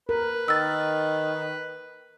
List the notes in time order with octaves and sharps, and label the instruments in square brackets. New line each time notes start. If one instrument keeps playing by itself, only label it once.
[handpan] A#4 [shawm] B4
[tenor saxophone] D#3 [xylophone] E6 A6